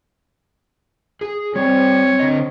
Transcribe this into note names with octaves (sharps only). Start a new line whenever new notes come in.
G#4
G3 C4 G#4 C#5
D3 D#5